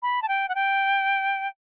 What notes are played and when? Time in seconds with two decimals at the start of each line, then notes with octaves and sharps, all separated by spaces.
0.03 B5
0.22 A5
0.28 G5
0.49 F#5
0.55 G5